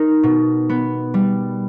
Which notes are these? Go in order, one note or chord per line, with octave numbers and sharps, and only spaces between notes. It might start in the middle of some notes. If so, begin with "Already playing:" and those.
Already playing: D#4 A#4
B2
B3
G3